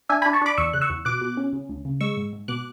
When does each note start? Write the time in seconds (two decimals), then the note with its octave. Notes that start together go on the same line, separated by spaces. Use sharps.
0.09 D4 E5 G#5
0.22 G#5 B5
0.26 D4
0.33 A5 C#6
0.42 D4 B5 D6
0.57 E2 C#6 E6
0.73 C#3 F#6
0.81 C#6 E6
0.90 E2
1.05 B2 D6 F#6
1.21 B2
1.37 C#4
1.53 C#3
1.69 D2
1.85 C#3
2.01 G#3 C#6 E6
2.17 G#2
2.33 G#2
2.48 B2 D6 F#6